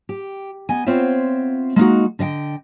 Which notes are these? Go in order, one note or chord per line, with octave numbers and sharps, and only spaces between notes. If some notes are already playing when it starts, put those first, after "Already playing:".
G4
B3 D#5 G#5
B3 C4 F4 C5 C#5 E5
G#3 A#3 D#4 F#4
D3 D#5 F5 G5